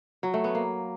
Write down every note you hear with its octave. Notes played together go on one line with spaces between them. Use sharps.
F#3
A3
B3
A#3